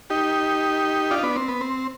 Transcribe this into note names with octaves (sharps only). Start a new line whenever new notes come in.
D#4 G4
D4 F4
D#4
B3 D4
C4
B3
C4